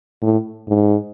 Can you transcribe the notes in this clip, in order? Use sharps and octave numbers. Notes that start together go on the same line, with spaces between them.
A2
G#2